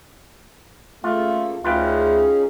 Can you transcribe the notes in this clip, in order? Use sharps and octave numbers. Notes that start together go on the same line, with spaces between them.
C#3 A3 A#3 F4 A4
D2 C#4 D#4 F4 G#4 B4 G5